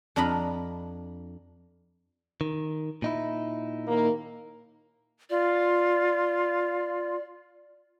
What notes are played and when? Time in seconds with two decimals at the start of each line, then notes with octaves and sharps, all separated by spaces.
0.16 F2 D4 D#5 A#5 B5
2.41 D#3
3.02 A#2 D#4 E4
3.88 D#2 A#3
5.30 F4 D5